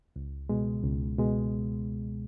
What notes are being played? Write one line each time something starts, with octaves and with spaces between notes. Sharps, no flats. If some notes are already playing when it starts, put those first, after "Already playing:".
C#2
B2 G#3
C#2
B2 G#3